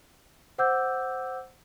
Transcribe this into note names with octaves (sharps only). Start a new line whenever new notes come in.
C5 F#5 D6 E6 G6